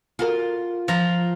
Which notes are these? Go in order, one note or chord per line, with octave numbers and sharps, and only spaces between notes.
F4 F#4 A#4
F3 A#5